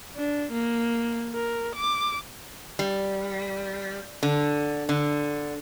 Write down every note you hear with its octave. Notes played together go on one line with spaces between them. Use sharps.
D4
A#3
A#4
D6
G3
D3
D3